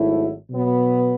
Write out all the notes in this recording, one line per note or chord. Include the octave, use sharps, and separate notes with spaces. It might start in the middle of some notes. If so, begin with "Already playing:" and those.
Already playing: G#1 G#2 F#3 A3 E4
B2 F#3 B3